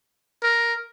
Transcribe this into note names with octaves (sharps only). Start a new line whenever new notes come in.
A#4